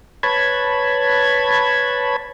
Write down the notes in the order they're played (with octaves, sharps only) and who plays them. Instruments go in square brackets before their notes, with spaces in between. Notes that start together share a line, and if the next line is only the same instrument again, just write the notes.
[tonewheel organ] B4 C#5 A5 B5 G#6